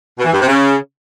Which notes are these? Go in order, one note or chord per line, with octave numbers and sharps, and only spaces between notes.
B2
E3
G2
C3
C#3